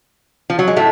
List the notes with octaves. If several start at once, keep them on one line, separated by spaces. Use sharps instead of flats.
F3
F#3
G#3
A2 A3